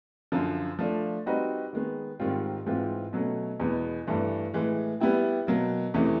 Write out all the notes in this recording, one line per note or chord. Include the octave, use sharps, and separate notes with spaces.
F#2 D3 F3
F3 A3 D4
G3 C4 D#4 F#4 B4
D#3 G#3 B3
G#2 D#3 G3 C4 F4
G#2 E3 G#3 C4 F4
B2 F#3 A3 C#4
E2 B2 G#3 B3
G2 E3 A3 D4
A2 E3 G#3
G3 B3 E4 G4
B2 F#3 A#3
E2 C3 E3 A3 C#4